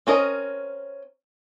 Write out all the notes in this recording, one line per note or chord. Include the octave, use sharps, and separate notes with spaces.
C4 C#4 A#4 D#5